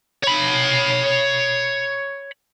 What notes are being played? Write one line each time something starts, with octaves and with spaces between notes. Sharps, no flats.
C#5 B5